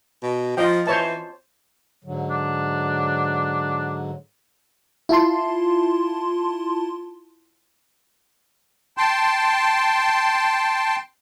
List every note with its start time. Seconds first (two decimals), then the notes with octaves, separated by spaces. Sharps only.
0.23 B2
0.57 F3 F4 D#5 G5
0.87 E3 C5 C#5 A5
2.04 G#2 D3 F#3
2.31 D4
5.09 E4 F4 A5 C6
8.97 G5 A5 C6